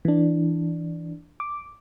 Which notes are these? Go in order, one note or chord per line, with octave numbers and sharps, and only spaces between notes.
E3 D4
D6